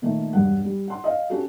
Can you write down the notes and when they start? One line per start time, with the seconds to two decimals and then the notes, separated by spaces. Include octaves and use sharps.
0.02 A#2 D#3 A3
0.33 E1 G2 F#5
0.65 G3
0.88 F#5 C6
1.04 D#5 F5
1.30 C#4 F#4 G4 A4